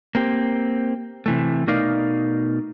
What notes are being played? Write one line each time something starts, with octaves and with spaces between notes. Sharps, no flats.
A#3 C4 G4
C3 E3 A3
B2 A3 D#4 A#4 D5 F5